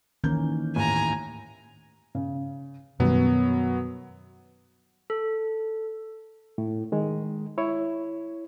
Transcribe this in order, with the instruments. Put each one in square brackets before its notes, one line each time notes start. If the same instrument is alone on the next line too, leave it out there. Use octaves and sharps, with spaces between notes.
[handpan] D#3 E3 C#4 [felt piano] A#3 G6
[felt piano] D#2 A2 [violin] G#5 A#5
[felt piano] C#3
[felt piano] F#2 [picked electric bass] B2 D#3 G3 [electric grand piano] F#3 B3
[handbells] A4
[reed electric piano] A2
D#3 G#3
E4 C#5